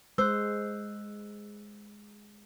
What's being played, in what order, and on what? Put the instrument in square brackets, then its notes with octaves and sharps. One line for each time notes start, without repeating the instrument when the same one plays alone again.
[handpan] G#3 [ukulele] C5 [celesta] E6 F#6